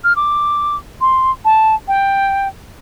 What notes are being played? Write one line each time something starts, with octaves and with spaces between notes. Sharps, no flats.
F6
D6
C6
A5
G5